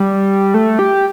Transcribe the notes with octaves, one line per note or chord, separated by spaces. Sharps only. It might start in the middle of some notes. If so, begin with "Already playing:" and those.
Already playing: G3
A3
G4